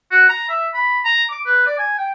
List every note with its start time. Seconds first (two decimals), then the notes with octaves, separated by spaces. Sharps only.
0.11 F#4
0.30 A#5
0.49 E5
0.74 B5
1.05 A#5
1.30 D6
1.46 B4
1.66 D5
1.79 G#5
1.98 G5